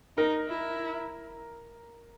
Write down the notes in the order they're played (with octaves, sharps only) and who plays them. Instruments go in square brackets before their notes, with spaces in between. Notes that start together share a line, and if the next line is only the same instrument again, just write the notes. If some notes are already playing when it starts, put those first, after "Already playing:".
[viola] D#4 [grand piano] A#4
[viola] E4